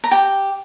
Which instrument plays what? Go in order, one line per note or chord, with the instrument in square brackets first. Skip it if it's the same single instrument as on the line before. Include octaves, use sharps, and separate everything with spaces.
[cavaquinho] A#5
G4 G5